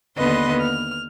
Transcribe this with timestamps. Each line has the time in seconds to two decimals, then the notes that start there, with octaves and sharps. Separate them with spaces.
0.17 D#2 D3 B3 B4 D#5 C6
0.59 F6